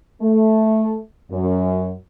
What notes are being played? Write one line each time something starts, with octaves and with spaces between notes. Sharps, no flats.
A3
F#2